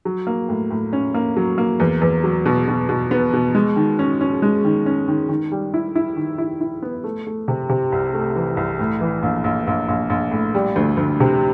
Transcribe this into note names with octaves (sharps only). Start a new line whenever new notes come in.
F#3
A#3
A2
A2
C#4
A#3
F#3
A#3
E2
E2
F#3
B2
B2
B2
B3
B2
G#3
D#3
C#4
C#4
G#3
D#3
C#4
D#3
D#3
G3
E4
E4
D#3
E4
E4
B3
A3
A3
C3
C3
C2
A3
E3
C2
A2
E3
A#1
A#1
A#1
A#1
A#1
A2
G3
D2
D2
C3